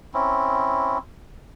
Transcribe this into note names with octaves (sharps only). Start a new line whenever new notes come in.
C4 C#4 E4